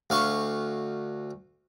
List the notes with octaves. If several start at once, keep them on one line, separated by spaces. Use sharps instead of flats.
D2 F5 C#6